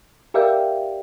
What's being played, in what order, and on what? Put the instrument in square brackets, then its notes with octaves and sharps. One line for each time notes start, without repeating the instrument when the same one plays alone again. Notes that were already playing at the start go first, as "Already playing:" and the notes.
[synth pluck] G4 A#4 D5 E5 F5 G5